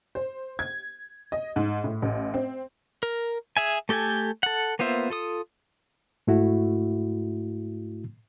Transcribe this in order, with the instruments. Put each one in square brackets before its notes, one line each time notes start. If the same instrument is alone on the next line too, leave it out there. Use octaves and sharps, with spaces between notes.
[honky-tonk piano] C5
G#6
D#5
G#2
A2
A1
C4
[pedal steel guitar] A#4
G#4 E5 G#5
A3 G4 A4 G5 G#5
A4 F#5
A#3 B3 F4 C5 E5
F4 A4 D#6
[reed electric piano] G#2 A3 E4 F#4